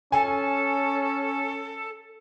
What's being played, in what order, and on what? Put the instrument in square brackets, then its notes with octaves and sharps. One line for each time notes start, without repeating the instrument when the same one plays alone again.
[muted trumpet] C#4 [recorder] A4 [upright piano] G#5